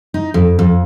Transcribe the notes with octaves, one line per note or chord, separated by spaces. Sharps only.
D#4
F2
F2